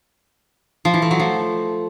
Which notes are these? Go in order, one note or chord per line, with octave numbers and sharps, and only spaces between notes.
F3
E3
A3
F#3
F3